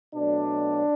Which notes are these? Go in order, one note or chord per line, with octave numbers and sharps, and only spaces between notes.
B2 F#3 A3 D4